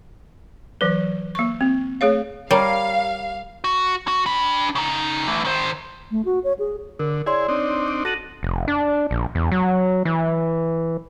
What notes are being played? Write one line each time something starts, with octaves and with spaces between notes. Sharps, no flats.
E3 F#3 B4
A#3 C#6
C4
A3 G#4 C#5 F5
G3 A#4 C#5 F5
F#4
F#4
D4 B5
C#3 D#4
E3 A3
D#3 C5
A3
F#4
C#5
G#4
D3 A#4
E4 G#4 C#5 D5 C6
C4 D4 D#4
D6 D7
F#4 A4 A#6 D#7 F#7
F1
D4
A#1
E2
F#3
E3